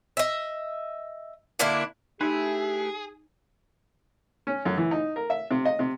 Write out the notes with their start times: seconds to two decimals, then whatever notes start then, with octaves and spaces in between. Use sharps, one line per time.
0.17 D#5 E5
1.59 D3 A#3 D4 E4
2.21 A3 D#4 E4 G4 G#4 B4
4.47 C#4
4.65 F#2
4.77 E3
4.91 D#4
5.16 A#4
5.30 E5
5.51 C3
5.65 D#5
5.79 C3